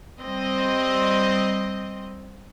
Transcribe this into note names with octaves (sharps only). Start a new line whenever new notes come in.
G3 C4 D#5